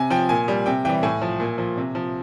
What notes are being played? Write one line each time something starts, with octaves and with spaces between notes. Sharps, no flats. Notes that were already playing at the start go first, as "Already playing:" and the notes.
Already playing: C3 G#5
F3 G5
A#2 G#5
G3
C3 G5
E3 G3 G5
A2 G#5
F3
A#2
F3
C3
F3